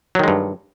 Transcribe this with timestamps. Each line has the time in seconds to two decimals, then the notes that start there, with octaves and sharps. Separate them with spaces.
0.15 F#3
0.19 D#3
0.24 G#3
0.28 G2